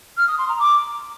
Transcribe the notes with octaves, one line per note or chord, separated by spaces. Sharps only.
F6
D#6
C6
A#5
D6